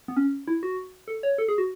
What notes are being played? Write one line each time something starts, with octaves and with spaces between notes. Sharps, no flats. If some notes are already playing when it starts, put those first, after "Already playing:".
B3
C#4
E4
F#4
A4
C#5
A4
G#4
F#4